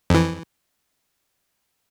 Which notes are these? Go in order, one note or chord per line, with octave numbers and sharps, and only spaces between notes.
F2 E3